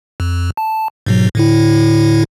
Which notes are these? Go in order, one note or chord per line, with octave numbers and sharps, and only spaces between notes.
F2
A5
G#2 B2 F#3
A2 D3 E4